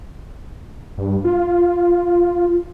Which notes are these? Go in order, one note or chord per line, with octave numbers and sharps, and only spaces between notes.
G2
F4